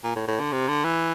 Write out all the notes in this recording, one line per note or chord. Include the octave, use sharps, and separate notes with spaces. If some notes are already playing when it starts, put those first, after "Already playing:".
A#2
A2
A2
D3
C3
D3
E3